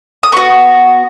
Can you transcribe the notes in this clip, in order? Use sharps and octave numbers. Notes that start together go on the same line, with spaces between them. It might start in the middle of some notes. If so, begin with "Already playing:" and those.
D#6
B3 F#4 C#6